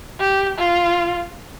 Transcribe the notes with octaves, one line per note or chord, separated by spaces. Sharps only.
G4
F4